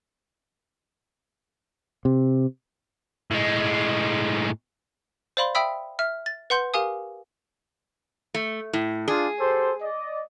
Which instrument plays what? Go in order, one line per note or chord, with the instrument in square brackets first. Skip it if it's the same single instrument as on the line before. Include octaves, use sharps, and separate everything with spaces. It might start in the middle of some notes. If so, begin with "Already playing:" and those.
[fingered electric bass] C3
[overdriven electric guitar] A2 G#3
[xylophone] C5 D5 F5 B5 C6
E5 G5 B5 D#6 E6 B6
E5 F6
A6
B4 F#5 C6 G6
G4 A#4 F5 G#5 D#6
[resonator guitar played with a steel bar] A3
A2
[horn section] D4 F4 [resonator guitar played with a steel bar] G#4
[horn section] G4 A4 C5
D5 D#5